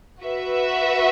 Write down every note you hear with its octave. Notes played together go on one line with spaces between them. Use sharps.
F#4 B4 E5